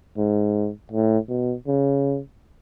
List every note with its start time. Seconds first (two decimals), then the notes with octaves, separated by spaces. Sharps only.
0.17 G#2
0.92 A2
1.29 B2
1.67 C#3